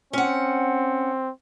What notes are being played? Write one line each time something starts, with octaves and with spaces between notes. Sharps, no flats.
C4 C#4 F#5